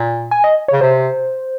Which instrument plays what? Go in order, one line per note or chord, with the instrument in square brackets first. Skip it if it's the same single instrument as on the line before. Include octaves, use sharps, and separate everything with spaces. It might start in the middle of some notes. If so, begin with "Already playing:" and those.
Already playing: [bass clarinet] A#2
[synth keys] G#5
D#5
[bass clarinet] C#3 [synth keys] C#5
[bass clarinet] C3 [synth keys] C5